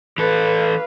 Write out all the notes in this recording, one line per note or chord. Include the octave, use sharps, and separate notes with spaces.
E3 A4 B4 F5